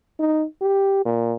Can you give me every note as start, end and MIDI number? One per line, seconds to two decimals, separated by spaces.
0.19 0.45 63
0.61 1.02 67
1.05 1.34 46